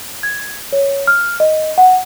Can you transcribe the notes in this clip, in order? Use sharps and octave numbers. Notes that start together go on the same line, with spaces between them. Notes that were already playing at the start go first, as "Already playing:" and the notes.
G#6
C#5
F6
D#5
F#5